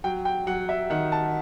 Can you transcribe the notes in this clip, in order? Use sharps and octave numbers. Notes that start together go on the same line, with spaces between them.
F#3 G5
G5
F#3 F#5
E5
D#3 F#5
A5